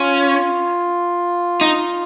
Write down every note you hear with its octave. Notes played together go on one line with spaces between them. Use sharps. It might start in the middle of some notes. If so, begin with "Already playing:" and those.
Already playing: C#4 F4
D#4